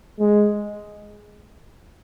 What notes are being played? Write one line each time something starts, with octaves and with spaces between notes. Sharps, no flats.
G#3